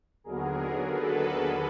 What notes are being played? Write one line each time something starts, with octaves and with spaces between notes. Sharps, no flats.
D#2 D3 F#3 B3 G#4 A#4
A4 B4